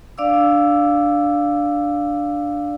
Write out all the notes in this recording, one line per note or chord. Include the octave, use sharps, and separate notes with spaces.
D4 D5 F5 D6 E6